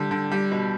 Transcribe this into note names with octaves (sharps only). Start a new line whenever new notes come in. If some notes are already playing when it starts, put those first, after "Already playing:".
Already playing: D3 G3
D3
G3
B2